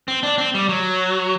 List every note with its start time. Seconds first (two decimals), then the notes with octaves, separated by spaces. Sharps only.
0.08 C4
0.23 D4
0.38 C4
0.55 G3
0.69 F#3